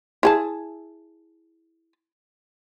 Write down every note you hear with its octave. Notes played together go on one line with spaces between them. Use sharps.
E4 G#4 A5